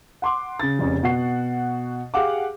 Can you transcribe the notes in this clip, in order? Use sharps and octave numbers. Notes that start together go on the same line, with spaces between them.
F#5 C6 D6
C#3 A6
F1 F2 C#3 C#4
B2 F#4 F#5 C7
G4 G#4 F5 F#5 D6